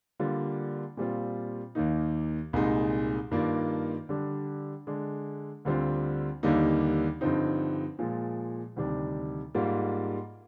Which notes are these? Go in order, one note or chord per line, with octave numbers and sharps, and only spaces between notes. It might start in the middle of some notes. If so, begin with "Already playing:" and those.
D3 G3 A#3 D4 F4
A#2 G3 C4 F4
D#2 D#3 A#3 D#4
C2 A#2 G#3 D#4
G2 D#3 A#3 D4 F4
D3 G3 D4
D3 G#3 D4
D2 D3 G3 C4 F4
D#2 D3 G3 A#3 D#4
G2 D3 F3 C4 D#4
A#2 F3 G#3
D2 C3 D#3 G3 D4
G#2 G3 A#3 F4